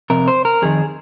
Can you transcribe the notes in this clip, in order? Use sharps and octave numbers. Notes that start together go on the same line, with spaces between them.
F2 C3 A#4
C5
A#4
F2 D#3 G#4